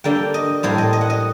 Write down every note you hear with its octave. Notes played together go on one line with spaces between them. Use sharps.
D3 G3 A#3 G5
D#5
A2 G3 A#3 C5
D#5
D#5
F#5
D#5